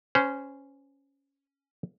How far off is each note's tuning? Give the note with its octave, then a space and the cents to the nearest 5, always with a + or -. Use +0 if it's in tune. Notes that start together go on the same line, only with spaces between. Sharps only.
C#4 +0 C5 -25